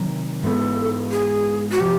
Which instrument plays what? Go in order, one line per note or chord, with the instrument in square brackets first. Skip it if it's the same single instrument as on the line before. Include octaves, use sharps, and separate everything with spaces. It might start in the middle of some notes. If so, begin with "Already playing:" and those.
Already playing: [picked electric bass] C3 D#3 F#3
[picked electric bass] G#2 E3 G#3 B3 [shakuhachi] A4
[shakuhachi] G#4
F#4
[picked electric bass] C3 F3 [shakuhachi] G4